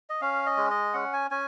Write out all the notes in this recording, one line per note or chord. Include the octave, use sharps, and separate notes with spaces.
D#5
C#4 F5
D#5
G#3
D#5
C#4 F#5
G#5
C#4 G#5